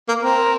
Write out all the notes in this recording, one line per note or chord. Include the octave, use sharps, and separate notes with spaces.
A#3
C4 A#4